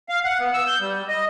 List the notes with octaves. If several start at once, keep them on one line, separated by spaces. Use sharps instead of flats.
F5
F#5
B3
E6
G6
G3
D#5